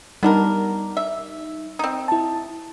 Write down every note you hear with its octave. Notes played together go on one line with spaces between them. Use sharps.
G3 B3 D4 D#4 A#4
E5
C4 D#4
E4 A5